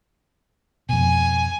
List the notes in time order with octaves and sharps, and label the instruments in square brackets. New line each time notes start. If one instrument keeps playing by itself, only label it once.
[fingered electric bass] F2 B2 [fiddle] G#5